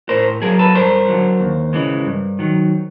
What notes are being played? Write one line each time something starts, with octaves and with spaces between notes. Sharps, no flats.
A2 A#4 C5
F#3 G#4 A#4
A4 B4
G2 A#4 C5
D3 F#3
D#2
C#3 E3 G#3
G2
D#3 F#3